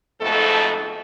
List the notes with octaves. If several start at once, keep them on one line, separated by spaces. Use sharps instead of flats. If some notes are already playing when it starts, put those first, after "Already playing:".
F2 G#2 B2 A3 A4